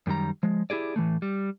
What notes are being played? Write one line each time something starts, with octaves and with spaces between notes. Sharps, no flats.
F#2 D#3 G3 A#5
F3 G#3
E4 G4 G#4 D5
A2 E3 G#3 A3
G3